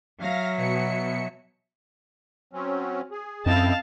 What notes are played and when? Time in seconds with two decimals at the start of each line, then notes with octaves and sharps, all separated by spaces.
0.20 F#3 E5 F5 A#6
0.57 B2 C#7
2.53 F#3 C4 C#4
3.11 G#4
3.46 F#2 C4 C#4 E4 D#5 F5 G5 A5